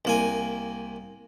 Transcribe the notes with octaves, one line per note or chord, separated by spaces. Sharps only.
C2 A#3 G#5